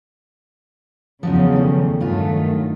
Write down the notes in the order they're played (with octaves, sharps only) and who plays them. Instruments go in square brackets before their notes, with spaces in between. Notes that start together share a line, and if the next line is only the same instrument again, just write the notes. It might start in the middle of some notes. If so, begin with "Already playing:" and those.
[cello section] E2 C#3 [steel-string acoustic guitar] F3 F#3 D#4
[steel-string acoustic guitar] D#3 A3
[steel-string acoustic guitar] G2 F4 G#5 [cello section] D#3 F#3 A3